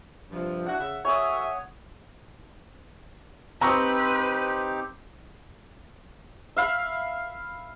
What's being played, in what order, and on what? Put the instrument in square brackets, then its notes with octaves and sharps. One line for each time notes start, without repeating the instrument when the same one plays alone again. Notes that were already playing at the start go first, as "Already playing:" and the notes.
[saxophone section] G2 C3 F3
[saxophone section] D4 E4 F#4 [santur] F#5
[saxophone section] C#3 E5
[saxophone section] F#4 A4 E5 [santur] C#5 G#5 D#6
[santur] C4 [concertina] D#4 G4 [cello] B4 [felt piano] A#5 C#6 D#6
[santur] E5 F5 B5